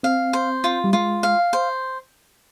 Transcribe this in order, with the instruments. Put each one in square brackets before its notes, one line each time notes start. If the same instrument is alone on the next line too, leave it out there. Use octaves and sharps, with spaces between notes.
[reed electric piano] C4 [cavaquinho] F5
[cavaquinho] C5
F4
[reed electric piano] G3
[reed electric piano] G#3 [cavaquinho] F4
[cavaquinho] F5
C5